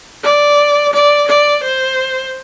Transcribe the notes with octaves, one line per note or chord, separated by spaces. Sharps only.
D5
D5
D5
C5